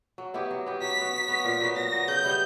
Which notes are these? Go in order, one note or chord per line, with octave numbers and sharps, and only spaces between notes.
F#3
B3 E4 G4
F#3
B3 E4 G4
F#3 B6
B3 F#4
F#3
B3 F#4
A#2
F#3 B3
A#2 A#6
F#3 B3
C#3 G6
G3 B3 E4